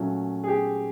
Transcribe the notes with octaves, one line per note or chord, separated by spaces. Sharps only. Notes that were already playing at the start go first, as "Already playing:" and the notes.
Already playing: A#2 F#3 A3 C#4
G#4
G4